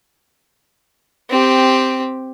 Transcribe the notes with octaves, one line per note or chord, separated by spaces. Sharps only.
C4 G4